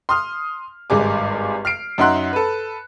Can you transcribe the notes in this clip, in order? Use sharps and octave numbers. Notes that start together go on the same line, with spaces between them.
C6 D#6 F6
G#1 G2 G#3 G#4 D6
F6 C7 D7
F#2 D#4 E5 F#5 C6 F#6
A4 B4